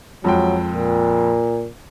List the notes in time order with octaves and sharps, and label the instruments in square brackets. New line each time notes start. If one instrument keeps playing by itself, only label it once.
[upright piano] F2 G#3 G5 [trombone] F#3
[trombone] A#2